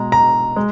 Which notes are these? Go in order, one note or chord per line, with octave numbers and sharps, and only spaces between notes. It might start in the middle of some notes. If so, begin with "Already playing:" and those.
Already playing: B2 G#3 A#5
A#5
G#3